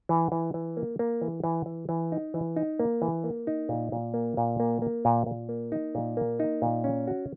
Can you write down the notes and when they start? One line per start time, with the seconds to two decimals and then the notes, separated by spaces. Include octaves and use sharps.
0.09 E3
0.32 E3
0.54 E3
0.77 A#3
0.99 A#3
1.22 E3
1.44 E3
1.66 E3
1.89 E3
2.12 D#4
2.34 E3
2.56 D#4
2.79 A#3
3.02 E3
3.24 A#3
3.47 D#4
3.69 A#2
3.92 A#2
4.14 A#3
4.37 A#2
4.60 A#3
4.82 A#3
5.05 A#2
5.26 A#2
5.49 A#3
5.72 D#4
5.95 A#2
6.17 A#3
6.40 D#4
6.62 A#2
6.84 C#4
7.08 F#4